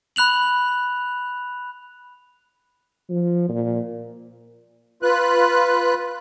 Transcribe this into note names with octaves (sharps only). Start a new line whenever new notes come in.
B5 F#6 F7 F#7
F3
A#2
F4 B4 F#6